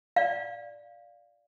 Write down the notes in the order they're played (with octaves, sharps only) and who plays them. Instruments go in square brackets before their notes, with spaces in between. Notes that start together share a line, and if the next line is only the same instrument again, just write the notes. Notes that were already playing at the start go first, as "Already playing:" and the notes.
[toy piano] D5 F5